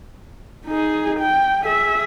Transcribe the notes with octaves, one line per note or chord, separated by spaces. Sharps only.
D#4 G#4
G5
G#4 E5